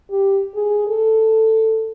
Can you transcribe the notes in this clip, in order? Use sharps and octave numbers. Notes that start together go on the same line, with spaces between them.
G4
G#4
A4